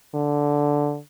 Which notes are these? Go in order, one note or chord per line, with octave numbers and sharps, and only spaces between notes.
D3